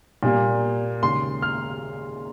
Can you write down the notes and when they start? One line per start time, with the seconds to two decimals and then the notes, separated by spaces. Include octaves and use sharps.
0.23 A#2 G3 A#3
1.02 D#2 C#3 G#3 C6
1.42 F6